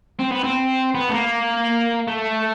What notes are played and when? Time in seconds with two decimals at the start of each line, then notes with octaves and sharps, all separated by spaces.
0.20 C4
0.32 B3
0.44 C4
0.94 B3
1.09 A3
1.13 A#3
2.08 A3